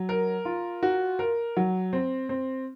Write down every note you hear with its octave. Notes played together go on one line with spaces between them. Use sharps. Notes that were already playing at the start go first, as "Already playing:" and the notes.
Already playing: F#3
A#4
F4
F#4
A#4
F#3
C4
C4